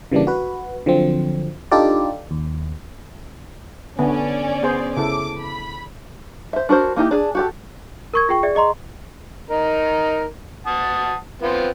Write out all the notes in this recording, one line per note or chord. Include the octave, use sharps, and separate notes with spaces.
C#3 E3 G3 A#3 D4
F#4 B4
D3 F3 F#3 C4
D4 D#4 F4 G4 A4 D5
D#2
D3 B3 C#4 D5
B3 G#4 C5
C#3 E4 A4 D6
B5
C5 E5
D4 F#4 A#4 C5
A#3 D#4 E4 G4
D4 G#4
F#4 G4 A4
A#4 C#6 G#6
F4 G#4 G5 C#6
G#4 D5 E5
G#4 D#5 A#5 C6
D#4 A#4
F#5 A5 D#6
B3 C4 F4